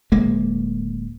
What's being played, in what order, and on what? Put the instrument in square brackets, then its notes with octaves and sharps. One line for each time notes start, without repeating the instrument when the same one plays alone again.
[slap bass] D1 G#3 A#3